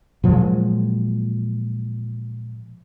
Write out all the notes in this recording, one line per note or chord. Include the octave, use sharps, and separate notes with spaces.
A#2 F3 F#3 G#3